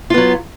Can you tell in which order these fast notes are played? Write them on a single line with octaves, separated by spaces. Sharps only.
F4 B3 F#3